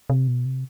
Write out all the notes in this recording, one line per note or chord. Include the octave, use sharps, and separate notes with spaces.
C3
B2
C3